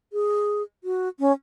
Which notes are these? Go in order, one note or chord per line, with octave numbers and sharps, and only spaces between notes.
G#4
F#4
C#4